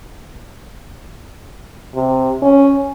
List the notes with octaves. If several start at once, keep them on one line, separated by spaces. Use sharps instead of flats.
C3
C#4